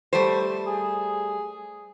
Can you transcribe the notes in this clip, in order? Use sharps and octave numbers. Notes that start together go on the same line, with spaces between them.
G3 A3 C5
G#4